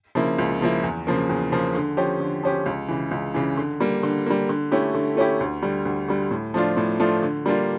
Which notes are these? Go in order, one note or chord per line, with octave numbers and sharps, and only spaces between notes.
C#3 F3 A#3 E4
C#2
C#3 F3 A#3 E4
E2
C#3 F3 A#3
E2
C#3 F3 A#3
D3
F3 C#4 G4
D3
F3 C#4 G4
C#2
C#3 E3
C#2
C#3 E3
D3
G3 A#3
D3
G3 A#3
D3
A3 C#4 E4 G4
D3
A3 C#4 E4 G4
D2
D3 G3
D2
D3 G3
A2
F3 A3 D4 F4
A2
F3 A3 D4 F4
D3
G3 A#3 D4 F4